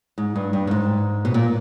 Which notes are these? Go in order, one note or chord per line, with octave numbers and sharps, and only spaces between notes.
G#2
G2
G2
G2
G#2
B2
A#2